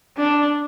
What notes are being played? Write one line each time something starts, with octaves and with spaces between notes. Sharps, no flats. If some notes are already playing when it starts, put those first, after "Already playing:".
D4